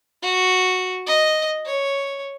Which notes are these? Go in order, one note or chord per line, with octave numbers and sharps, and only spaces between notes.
F#4
D#5
C#5